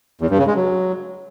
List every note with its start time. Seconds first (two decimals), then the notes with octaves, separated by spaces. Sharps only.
0.21 E2
0.30 G2
0.38 C#3
0.47 G#3
0.55 F#3